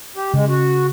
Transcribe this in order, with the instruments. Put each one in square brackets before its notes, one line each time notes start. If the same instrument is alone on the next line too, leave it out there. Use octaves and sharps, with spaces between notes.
[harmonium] G4
[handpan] C#3 [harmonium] G#3
[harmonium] F#4